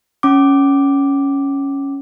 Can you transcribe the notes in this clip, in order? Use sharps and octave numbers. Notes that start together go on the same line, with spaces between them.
C#4 D6